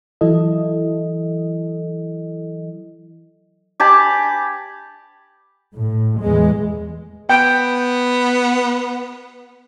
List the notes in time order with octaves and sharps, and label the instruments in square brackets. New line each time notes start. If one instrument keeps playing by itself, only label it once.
[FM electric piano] E3 F#3 E4 A4 D#5
[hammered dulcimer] G4 G#5 A5 B5
[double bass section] A2
E2 G#3
[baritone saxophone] B3 [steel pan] G5